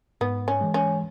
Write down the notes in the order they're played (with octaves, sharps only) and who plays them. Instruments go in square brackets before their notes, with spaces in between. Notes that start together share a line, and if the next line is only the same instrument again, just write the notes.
[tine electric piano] G#2 [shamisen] B3
[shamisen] C#4
[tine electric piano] E3 G#3
[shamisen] C#4